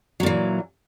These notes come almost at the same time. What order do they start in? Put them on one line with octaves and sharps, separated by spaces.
F#3 A#2 E3